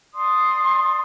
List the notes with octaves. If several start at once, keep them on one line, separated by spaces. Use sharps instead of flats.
D5 C6 D#6